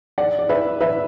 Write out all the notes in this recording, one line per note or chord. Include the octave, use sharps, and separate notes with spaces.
D5 F#5
D5
B4 E5
B4 E5